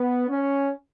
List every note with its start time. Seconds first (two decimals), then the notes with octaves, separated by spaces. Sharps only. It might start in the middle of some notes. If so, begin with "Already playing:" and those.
Already playing: B3
0.28 C#4